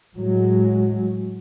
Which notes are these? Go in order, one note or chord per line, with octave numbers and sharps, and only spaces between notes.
A2 F#3 G#3